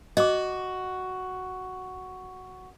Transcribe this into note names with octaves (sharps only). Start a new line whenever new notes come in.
F#4 D#5 D6